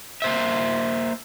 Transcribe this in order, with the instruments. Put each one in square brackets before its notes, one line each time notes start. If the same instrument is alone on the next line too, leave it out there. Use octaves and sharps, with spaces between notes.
[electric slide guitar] A#3 C5 E5